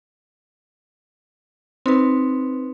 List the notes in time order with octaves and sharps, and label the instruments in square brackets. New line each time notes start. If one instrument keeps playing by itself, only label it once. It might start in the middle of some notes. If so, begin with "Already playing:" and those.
[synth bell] C4 D#4 B4